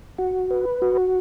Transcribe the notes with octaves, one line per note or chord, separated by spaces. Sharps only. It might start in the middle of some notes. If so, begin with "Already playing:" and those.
F#4
B4
F#4